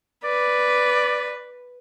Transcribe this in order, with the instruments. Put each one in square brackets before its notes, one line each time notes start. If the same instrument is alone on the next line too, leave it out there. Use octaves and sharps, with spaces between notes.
[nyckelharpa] B4 [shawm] D5